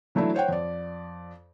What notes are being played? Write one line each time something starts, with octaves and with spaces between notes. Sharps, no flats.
E3 F#3 A3 D4 E4
C5 C#5 F#5 G5
F2 D5